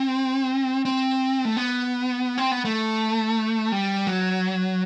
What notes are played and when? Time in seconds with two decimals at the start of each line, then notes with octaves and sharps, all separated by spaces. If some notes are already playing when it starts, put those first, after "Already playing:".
Already playing: C4
0.85 C4
1.45 A3
1.57 B3
2.38 C4
2.51 B3
2.65 A3
3.72 G3
4.07 F#3